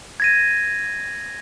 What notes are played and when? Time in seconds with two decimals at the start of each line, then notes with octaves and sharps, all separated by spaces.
0.20 G#6 A#6 D#7